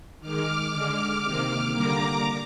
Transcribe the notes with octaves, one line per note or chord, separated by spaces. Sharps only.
D#3 G#3 D6 F6
D3 G#3 D6 F6
C3 D#3 A#3
D3 G3 A#3 A#5 D6